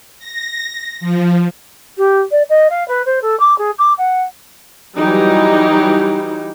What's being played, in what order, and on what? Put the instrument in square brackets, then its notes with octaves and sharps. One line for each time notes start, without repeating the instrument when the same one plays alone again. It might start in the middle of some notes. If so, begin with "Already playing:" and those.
[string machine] A#6
F3
[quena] G4
D5
D#5
F5
B4
C5
A4
D6
G#4
D6
F#5
[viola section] E3 F#3 G3 D#4 G4